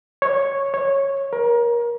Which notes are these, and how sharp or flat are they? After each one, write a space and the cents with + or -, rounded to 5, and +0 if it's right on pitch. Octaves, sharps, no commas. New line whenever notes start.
C#5 -5
C#5 -10
A#4 +25